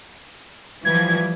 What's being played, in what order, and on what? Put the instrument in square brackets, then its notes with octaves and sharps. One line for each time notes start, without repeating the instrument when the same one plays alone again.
[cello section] E3 F3 G3 [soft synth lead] G#6